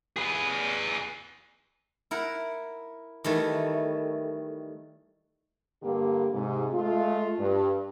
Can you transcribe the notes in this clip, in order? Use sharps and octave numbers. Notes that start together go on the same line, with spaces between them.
G#4 B4
E4 A#4 F#5
D#3 E3 G3 A3
G2 D3 A#3 G4
G#2 C3
G#3 A3 F4
G2